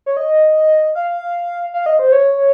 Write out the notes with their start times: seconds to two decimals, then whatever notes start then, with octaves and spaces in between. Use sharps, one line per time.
0.06 C#5
0.17 D#5
0.95 F5
1.74 F5
1.86 D#5
1.99 C5
2.12 C#5